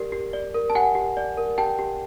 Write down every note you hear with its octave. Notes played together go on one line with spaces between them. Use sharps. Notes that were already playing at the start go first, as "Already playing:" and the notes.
Already playing: G4 A#4 D5
G4
D5
A#4
A5
G4 F#5 G#5
G4
D5
A#4
G4 G5 A5
G4